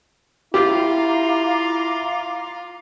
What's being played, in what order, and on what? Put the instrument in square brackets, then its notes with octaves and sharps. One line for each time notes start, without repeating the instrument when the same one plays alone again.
[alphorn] E4 [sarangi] F4 [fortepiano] G4 [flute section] F5 A#5 D6